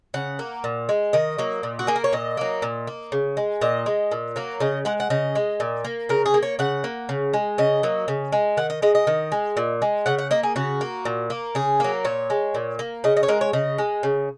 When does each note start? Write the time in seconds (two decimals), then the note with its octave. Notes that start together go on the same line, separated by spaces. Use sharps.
0.14 C#3 F#5
0.39 A#3
0.64 A#2
0.89 G#3
1.13 D#3 D#5
1.38 F#3 A#3
1.63 A#2
1.79 F#4
1.87 A#3 G#4
1.96 A#4
2.04 C#5
2.13 A#2 D#5
2.37 F#3 A#3
2.62 A#2
2.87 A#3
3.12 C#3
3.37 G#3
3.61 A#2 D#5
3.86 G#3
4.11 A#2
4.36 F#3 A#3
4.60 C#3 D#5
4.85 G#3 F#5
5.00 F#5
5.10 C#3 D#5
5.35 G#3
5.60 A#2
5.85 A#3
6.09 C#3 A#4
6.26 G#4
6.34 A#3
6.43 C#5
6.59 C#3 F#5
6.84 A#3
7.09 C#3
7.33 G#3
7.58 C#3 D#5
7.83 F#3 A#3
8.08 C#3
8.32 G#3
8.57 D#3 F#5
8.70 D#5
8.82 G#3 D#5
8.95 D#5
9.07 D#3
9.32 G#3
9.57 A#2
9.82 G#3
10.06 C#3 F#5
10.19 F#5
10.31 A#3 D#5
10.43 G#4
10.56 C#3 F#4
10.81 A#3
11.05 A#2
11.30 A#3
11.55 C#3 G#4
11.80 F#3 A#3
12.05 A#2 C#5
12.30 G#3
12.55 A#2
12.79 A#3
13.04 C#3 D#5
13.17 D#5
13.23 C#5
13.28 G#3 A#4
13.41 C#5
13.53 C#3 D#5
13.78 G#3
14.03 C#3